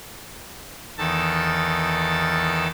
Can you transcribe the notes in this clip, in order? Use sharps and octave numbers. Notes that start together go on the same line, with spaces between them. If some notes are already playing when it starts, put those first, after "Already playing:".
E2 D#3 A4 A5